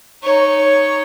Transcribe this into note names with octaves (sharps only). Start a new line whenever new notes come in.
D#4 C#5